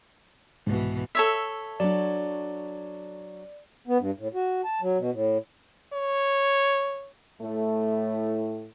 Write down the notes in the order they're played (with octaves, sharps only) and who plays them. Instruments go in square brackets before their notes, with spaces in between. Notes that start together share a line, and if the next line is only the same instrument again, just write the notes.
[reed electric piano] C2 G#2 [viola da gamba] B2 E3
[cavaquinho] A4 C#5 E5
[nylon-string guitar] F#3 D4 [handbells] D5
[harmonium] B3
G2
A2
F#4
A5
F#3
B2
A2
[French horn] C#5
[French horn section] A2 A3